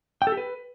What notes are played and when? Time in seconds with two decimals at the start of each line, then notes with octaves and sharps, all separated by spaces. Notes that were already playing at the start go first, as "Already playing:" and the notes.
0.22 G5
0.27 A4
0.32 G4
0.37 B4